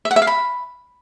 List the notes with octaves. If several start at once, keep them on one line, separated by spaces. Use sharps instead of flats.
E5
F#5
E5
F5
B5